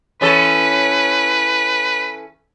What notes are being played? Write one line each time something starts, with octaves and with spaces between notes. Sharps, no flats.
E3 C#4 A4 B4